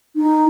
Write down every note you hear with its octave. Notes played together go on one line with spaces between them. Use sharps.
D#4